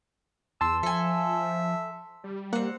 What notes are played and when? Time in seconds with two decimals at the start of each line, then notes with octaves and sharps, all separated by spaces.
0.61 E2 A5 C6 E6
0.83 F3 A4 E5 G#5
2.24 G3
2.53 A#3 C4 F#5